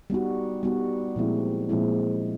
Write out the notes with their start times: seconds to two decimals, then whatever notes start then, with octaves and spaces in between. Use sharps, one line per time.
0.10 G3 B3 D#4 F#4
0.63 G3 B3 D#4 F#4
1.16 A#2 F3 G#3 C4 E4
1.69 A#2 F3 G#3 C4 E4